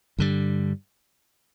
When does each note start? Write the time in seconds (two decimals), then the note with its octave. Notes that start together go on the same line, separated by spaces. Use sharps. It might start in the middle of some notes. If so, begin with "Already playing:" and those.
0.18 G2 D3 G3